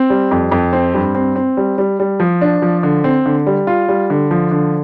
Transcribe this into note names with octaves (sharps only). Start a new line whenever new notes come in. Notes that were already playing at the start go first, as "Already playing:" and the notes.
Already playing: C4
G3
F2
F2
C4
G2
C4
C4
G3
G3
G3
F3
D4
F3
D3
C4
D3
G3
F4
G3
D3
F3
D3